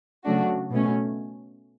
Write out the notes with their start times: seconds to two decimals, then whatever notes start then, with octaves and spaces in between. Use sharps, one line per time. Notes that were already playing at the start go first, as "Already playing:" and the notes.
0.25 C#3 F#3 A3 D4 F#4
0.71 B2 A3 C#4